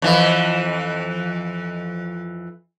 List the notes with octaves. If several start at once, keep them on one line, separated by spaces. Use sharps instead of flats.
F2 E3